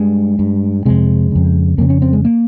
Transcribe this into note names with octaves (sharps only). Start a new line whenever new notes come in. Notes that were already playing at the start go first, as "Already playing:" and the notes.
Already playing: G2 G#3
G2
F2 C3 G#3
F2 C#3
F2 C#3 A#3
C#4
C4
G#3
A#3